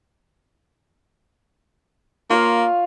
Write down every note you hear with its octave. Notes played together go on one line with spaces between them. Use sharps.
A#3 F4 C#5 F5